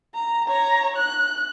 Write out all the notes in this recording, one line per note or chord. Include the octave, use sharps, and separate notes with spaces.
A#5
C#5 A#5
F#6